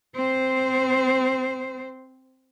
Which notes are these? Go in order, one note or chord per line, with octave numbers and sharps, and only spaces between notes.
C4 C5